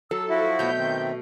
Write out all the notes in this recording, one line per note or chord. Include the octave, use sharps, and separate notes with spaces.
F#3 A4 E6
F3 E4 F#4 E5
B2 A3 C#5 G6
D#3 C4